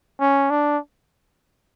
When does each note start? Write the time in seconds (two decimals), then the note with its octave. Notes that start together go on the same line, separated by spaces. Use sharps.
0.20 C#4
0.50 D4